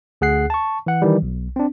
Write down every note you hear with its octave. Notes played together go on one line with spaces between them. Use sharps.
D2 G#4 F#5 F#6 C7
A5 C#6
E3 F#5
D#3 E3 G3
B1
C4 D4